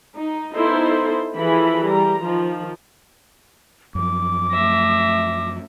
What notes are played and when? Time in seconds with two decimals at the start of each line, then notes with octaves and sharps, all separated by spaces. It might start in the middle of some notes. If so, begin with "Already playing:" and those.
0.17 D#4
0.53 B3 D#4 E4 A4 C5
1.35 E3 F3 E4 G#4 A4 B5
1.85 G3 A#5
2.23 D#3 F3
3.95 F#2 F3 D6
4.52 A3 E5 A#6